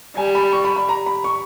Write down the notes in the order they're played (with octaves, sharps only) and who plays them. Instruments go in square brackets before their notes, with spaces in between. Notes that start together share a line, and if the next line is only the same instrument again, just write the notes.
[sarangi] G3 [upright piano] G#5
[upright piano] B5
C#6
B5
B5
A#5
B5
C#6